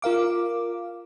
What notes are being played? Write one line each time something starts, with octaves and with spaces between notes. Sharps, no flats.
F4 A#4 F5 D6